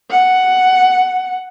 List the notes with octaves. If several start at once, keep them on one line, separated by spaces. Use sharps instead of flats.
F#5